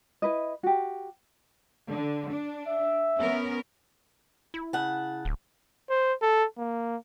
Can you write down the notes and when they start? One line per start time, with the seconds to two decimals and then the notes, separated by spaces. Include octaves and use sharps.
0.22 E4 B4 D#5
0.63 F#4 G4
1.88 D3
2.30 D4
2.67 E5
3.18 B3 C#4 A#4
4.54 E4
4.73 C#3 F#5 A5
5.25 D1
5.90 C5
6.22 A4
6.58 A#3